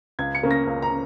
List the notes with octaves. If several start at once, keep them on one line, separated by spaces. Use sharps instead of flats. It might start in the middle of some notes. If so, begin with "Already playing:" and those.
C#2 G#6
C#7
C#3 A#3 C#4
A#6
C#2
A#5
C#3